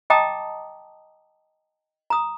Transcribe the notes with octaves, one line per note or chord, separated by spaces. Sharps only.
D#5 G5 A5 A#5 D6 D#6
A#5 D#6